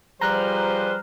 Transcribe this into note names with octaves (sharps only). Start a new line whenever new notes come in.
F3 G3 G#4 B4 C5 A#5 F6 F#6